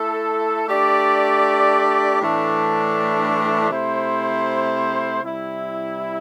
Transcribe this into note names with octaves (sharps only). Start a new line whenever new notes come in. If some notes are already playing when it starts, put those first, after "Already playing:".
Already playing: A3 E4 A4
A3 D4 G4 D5
A2 E3 A3 D4
C3 A3 E4 C5
C3 G3 E4